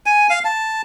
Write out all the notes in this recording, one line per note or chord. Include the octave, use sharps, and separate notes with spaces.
G#5
F5
A5